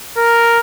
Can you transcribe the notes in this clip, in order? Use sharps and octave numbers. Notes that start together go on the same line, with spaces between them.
A#4